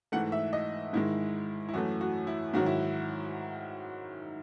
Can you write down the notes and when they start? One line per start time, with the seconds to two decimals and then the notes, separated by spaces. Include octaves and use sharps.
0.12 G#2 E3 A3 F#5
0.32 E5
0.53 D#5
0.93 G#2 D#3 G#3 E4
1.69 E4
1.73 F#2 E3 A3 F#4
2.01 F#4
2.27 E4
2.53 G#2 D#3 F#3 F#4
2.66 E4